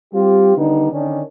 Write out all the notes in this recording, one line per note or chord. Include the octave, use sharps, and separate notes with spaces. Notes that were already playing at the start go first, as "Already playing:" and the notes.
G3 C4 F4 G4
D3 D#3 G3 B3 D4 D#4
D3 D#3 C#4 D4